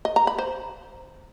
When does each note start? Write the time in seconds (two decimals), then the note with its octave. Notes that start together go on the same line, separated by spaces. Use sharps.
0.05 D#5
0.16 A#5
0.27 B5
0.38 C5